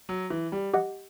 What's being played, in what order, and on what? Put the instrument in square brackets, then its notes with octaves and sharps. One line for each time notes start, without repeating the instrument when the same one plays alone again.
[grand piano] F#3
E3
G3
[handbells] G4 D#5 F#5